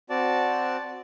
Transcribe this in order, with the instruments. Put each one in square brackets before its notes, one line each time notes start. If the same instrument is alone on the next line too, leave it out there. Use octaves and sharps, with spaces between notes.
[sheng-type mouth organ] C4 F#4 D5 A5